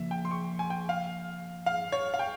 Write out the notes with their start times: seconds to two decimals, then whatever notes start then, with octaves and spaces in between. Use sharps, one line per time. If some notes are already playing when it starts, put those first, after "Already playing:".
Already playing: C#3 F3 A#3 E5
0.11 G5
0.25 C6
0.31 C#6
0.59 G#5
0.70 G5
0.89 F5
1.66 F5
1.92 C#5
2.14 F5
2.19 G5